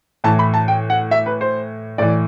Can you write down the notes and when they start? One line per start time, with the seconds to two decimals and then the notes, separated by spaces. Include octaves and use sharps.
0.24 A2 E3 A5
0.39 B5
0.54 A5
0.68 G5
0.90 F#5
1.11 E5
1.26 B4
1.41 C5
1.98 A2 E3 D5